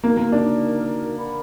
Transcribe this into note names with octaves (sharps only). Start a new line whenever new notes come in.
A#3 D#4 F#4 A#4
A#3
D4
A#4 D5 F#5 B5